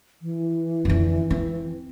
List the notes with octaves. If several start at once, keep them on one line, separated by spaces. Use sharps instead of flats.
E3
F2 D3
C4